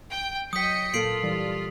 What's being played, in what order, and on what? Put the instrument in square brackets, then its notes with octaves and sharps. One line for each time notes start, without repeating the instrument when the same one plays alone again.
[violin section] G5
[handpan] F#3 [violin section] D#5 G5 C#7 [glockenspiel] D#6 B6
[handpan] A#2 A#3 A4 [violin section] F4 [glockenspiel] C7 D7 F#7
[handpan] E3 G3